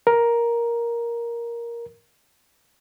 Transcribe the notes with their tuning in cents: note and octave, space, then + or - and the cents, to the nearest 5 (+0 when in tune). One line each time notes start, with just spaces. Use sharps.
A#4 +10